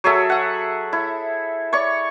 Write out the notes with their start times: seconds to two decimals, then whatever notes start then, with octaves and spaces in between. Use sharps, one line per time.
0.04 F#3 G#4 A4 E5
0.30 E5 F#5
0.93 E4
1.73 C#5 D5 C#6